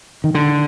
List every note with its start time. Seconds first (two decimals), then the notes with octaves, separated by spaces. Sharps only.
0.24 D#3
0.35 D3